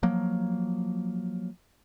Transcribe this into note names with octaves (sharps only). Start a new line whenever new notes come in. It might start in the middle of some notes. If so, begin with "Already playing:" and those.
F3 F#3 A#3